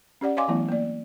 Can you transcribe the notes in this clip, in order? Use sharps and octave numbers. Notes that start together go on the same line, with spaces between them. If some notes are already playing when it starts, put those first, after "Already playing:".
C#4 G4 D5 F#5
C#5 D#5 F5 G#5 C6 D6
E3 F#3 A3 B3 E4
A#3 D5